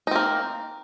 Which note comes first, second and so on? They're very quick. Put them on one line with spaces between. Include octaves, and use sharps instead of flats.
D#4 C4 A#3